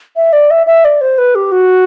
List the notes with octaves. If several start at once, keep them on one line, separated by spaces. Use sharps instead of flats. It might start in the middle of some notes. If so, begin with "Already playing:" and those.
E5
D5
E5
E5
D5
C5
B4
G4
F#4